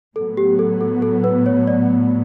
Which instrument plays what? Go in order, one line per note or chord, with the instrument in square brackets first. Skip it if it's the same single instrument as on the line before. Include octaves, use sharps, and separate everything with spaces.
[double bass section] A2 F#3 B3 [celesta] A4
[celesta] G4
A4
A4
A4
B4
C#5
D5